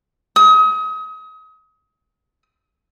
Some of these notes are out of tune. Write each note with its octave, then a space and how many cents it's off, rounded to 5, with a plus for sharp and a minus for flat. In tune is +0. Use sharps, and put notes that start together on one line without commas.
D#6 +35